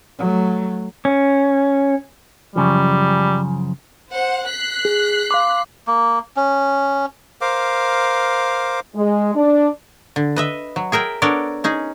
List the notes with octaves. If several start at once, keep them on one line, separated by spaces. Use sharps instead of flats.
F#3 A3
C#4
F#2 C#3 F3 G3
C5 F#5
F#6 B6 C7
G#4
F5 C6 D6
A#3
C#4
A#4 C5 F5 D6
G#3
D4
D3
B4 D#5 E5
F#3
G#4 A#4 E5 G5
B3 D4 A4 A#4 C#5 D5
C#4 D#4 G#4